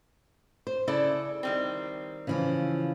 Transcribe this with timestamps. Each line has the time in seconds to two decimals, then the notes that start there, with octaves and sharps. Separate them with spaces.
0.67 C5
0.88 C#3 E4 A4 D5
1.43 D#3 G3 C4
2.27 C#3 E3 F3